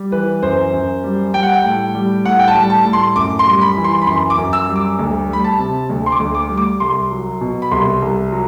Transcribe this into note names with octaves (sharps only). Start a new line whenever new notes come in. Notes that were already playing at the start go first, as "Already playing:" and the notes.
Already playing: G3
E3 B4
F#2 C5
F#2
G3
G3 G5
F#5
G5
A2
G3
A2 F#5
G5
A5
G3
A5
A2
C6
F#2 D6
C6
G3
B5
E3
C6
B5
F#2 C6
D6
F#2
E6
G3
D6
D2
G3 B5
A5
C3
D2
C6
D6
D2
D6
G3
D6
C2 C6
F#3
B2
B5
C2 C6
C2
F#3